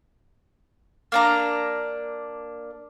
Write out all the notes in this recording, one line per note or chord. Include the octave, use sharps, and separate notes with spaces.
A#3 D4 A#5